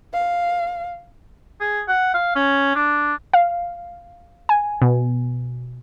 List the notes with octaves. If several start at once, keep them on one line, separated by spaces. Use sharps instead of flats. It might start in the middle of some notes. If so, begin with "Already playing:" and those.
F5
G#4
F#5
F5
C#4
D4
F5
G#5
B2